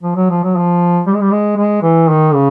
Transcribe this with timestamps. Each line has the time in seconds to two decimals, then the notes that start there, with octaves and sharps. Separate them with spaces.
0.03 F3
0.16 F#3
0.30 F3
0.43 F#3
0.57 F3
1.06 G3
1.14 G#3
1.22 G3
1.31 G#3
1.57 G#3
1.83 E3
2.09 D#3
2.34 C#3